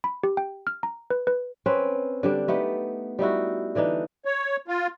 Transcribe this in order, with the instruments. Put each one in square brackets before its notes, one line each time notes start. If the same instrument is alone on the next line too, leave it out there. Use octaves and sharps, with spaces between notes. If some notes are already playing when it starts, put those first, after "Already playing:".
[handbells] B5
G4
G5
F6
A#5
B4
B4
[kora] C4 C#4 B4
D3 G3 D4
A3 B3 D#4 G4
G3 D#4 E4 F#4
D3 E3 D4 D#4
[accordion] C#5
F4